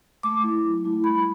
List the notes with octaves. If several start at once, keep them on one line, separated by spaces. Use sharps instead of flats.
A3 D6
E4
F#3
A3 E4
G3 B5